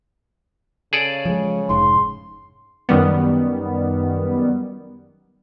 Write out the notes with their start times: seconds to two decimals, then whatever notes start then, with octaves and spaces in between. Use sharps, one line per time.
0.93 C#3 G#4 A4 D5
1.25 F3 G#3
1.69 F1 G#2 C6
2.89 F#2 D#3 G3 B3